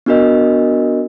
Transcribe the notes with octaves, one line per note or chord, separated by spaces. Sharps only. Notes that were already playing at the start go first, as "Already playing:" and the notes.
B3 D4 F#4 A#4 D#5